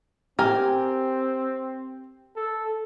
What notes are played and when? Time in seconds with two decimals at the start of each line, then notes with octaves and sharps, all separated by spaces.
0.39 C4 G4 A#4 G#5
2.36 A4